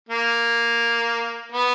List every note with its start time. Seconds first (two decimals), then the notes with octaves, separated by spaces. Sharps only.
0.09 A#3
1.52 B3